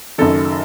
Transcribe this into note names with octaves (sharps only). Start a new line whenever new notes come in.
F#1 F#2 D#3 A4